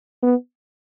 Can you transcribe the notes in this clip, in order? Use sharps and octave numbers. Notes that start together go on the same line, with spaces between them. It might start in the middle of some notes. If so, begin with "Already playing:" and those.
B3